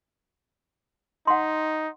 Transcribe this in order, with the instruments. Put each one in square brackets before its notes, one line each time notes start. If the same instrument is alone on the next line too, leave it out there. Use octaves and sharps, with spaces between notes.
[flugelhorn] D#4 [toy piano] F#5 C6